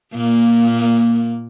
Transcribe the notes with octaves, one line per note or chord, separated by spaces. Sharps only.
A#2 A#3